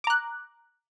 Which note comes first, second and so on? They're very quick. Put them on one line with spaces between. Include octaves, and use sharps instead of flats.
D6 A#5 F#6